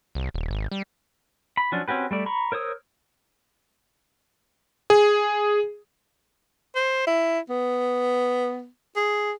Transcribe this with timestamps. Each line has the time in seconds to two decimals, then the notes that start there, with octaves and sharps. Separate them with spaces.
0.15 C2
0.34 D#1
0.51 G#1
0.71 G3
1.57 B5
1.72 F3 F#3 C#4 D4
1.88 C4 C#4 F#4 G4 B4
2.11 G3 A3 D5
2.26 A#5 B5 C#6
2.52 A#4 C5 C#5 D#6 E6
4.90 G#4
6.75 C5
7.07 E4
7.50 B3
8.96 G#4